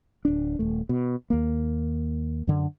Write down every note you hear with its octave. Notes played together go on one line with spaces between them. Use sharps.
D1 D4
D#1 A3
B2
D#2 A#3
F#2 D3